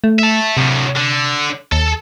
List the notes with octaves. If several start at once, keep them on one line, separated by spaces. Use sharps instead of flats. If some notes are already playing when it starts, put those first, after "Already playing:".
A3
E5 A5
D2 A2 C3
D3
D#2 A4